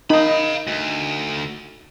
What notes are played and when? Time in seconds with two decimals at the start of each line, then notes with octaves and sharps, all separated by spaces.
0.10 D#4 F5 B5
0.67 D2